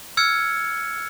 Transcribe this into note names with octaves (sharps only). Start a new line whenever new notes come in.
E6 F6 G#6 C#7